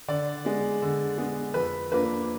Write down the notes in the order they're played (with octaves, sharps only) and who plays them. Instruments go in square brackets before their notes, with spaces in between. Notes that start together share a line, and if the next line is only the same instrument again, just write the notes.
[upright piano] D3 D5
G#3 B3
D3
G#3 B3
F2 B4
F3 A#3 D4 B4